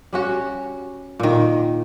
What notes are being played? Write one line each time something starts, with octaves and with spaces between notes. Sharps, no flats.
G3 C#4 F#4
A#2 D#3